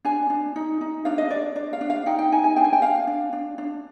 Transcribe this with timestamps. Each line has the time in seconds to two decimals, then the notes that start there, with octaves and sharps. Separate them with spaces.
0.05 D4 G#5
0.30 D4
0.56 D#4
0.81 D#4
1.05 D4 F5
1.18 D#5
1.30 D4 D5
1.56 D4 D5
1.73 F5
1.81 D4
1.90 F5
2.06 D#4 G5
2.19 G5
2.32 D#4 G#5
2.44 G#5
2.56 D4 G5
2.64 G#5
2.73 G5
2.82 D4 F5
3.07 D4
3.33 D4
3.58 D4